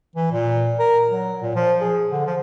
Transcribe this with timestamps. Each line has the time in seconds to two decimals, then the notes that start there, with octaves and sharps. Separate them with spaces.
0.16 E3
0.32 A#2
0.79 A#4
1.09 F#3
1.42 A#2
1.55 F3
1.81 G#4
2.11 D3
2.27 F3